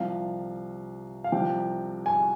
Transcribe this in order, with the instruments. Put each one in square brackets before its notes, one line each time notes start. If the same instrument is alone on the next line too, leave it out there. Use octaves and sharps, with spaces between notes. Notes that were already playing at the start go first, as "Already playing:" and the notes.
Already playing: [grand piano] C2 C3 F3 F5
F5
C2 C3 F3 G5
G#5